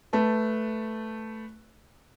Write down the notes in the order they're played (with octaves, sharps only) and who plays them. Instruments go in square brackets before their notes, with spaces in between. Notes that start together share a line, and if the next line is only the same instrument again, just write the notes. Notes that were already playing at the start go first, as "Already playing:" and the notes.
[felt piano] A3 B4 A5